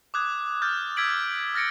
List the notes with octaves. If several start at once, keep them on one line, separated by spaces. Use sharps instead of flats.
D6 D#6 F#6 G#6
D6 F6 G6 A6
E6 G#6 B6 D7 F#7
F6 A6 A#6 C#7 D7